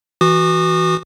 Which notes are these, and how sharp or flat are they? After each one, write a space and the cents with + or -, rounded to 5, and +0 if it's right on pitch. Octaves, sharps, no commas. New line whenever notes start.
E3 +0 F#4 +0 D#6 -40